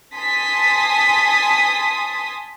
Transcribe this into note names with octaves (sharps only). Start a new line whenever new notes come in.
G#5 A5 C6 D#6 B6